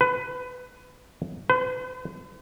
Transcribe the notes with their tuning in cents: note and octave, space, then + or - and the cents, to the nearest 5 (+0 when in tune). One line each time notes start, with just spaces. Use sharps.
B4 +20
B4 +45